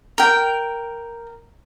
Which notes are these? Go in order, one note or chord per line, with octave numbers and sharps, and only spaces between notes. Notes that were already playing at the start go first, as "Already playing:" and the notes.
A#4 G5